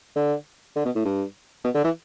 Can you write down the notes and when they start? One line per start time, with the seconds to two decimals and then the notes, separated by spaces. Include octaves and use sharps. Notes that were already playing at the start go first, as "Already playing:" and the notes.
0.16 D3
0.76 D3
0.85 B2
0.95 A2
1.05 G2
1.64 B2
1.75 D3
1.84 E3